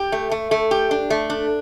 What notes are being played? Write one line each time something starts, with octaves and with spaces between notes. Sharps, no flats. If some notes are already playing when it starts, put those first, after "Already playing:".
Already playing: G4
A3
A3
A3
G4
D4
A3
D4